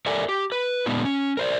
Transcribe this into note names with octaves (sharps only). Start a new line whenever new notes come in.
G4 A4 A#4 D5 E5 G#5
G4
B4
A#2 G#3 B3 D4 D#4 G4
C#4
A#4 C5 D5